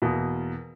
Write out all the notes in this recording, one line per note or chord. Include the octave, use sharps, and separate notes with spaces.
E2 B2 A#3